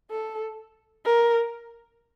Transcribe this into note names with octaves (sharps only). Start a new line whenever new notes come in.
A4
A#4